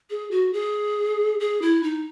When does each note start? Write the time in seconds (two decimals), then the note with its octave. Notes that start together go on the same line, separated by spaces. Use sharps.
0.10 G#4
0.31 F#4
0.53 G#4
1.40 G#4
1.62 E4
1.83 D#4